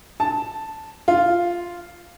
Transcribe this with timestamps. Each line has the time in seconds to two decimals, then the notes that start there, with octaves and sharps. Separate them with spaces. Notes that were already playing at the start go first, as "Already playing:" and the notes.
0.20 A5
1.08 F4